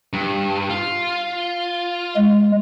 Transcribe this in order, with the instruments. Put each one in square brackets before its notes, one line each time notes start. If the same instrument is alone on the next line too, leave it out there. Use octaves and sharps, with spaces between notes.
[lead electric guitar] G2
F4
[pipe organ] G#3